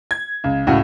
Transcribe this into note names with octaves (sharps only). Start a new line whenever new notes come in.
G#6
C#2
C#2 A2 F#4